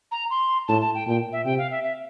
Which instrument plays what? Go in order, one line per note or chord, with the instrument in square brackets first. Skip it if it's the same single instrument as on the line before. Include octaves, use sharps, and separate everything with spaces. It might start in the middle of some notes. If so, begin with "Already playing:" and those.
[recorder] A#5
C6
[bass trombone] A2 [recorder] A5
[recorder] A5
G5
[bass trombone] A#2 [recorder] G5
[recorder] E5
[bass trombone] C3 [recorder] G5
[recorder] F5
E5
E5